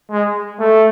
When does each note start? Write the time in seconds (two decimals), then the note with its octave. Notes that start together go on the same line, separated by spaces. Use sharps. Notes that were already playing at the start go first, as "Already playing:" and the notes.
0.11 G#3
0.60 A3